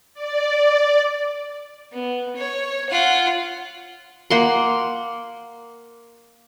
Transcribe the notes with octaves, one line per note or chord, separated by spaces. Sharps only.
D5
B3
C#5
F4 F#5
A#3 F#5 C6